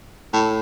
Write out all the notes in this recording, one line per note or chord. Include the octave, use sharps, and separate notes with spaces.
A2